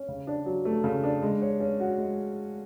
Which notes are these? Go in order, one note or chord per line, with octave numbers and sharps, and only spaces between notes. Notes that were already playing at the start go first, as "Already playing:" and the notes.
Already playing: C#4
C#3
D4
F#3
A3
C#3
D4
G#3
C#5
C#4
F#4
G#3